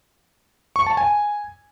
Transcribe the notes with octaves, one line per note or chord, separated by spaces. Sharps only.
C#6
A5
G#5